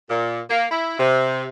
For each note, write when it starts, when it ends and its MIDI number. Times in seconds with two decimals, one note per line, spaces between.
0.09 0.41 46
0.49 0.65 58
0.71 0.95 64
0.99 1.47 48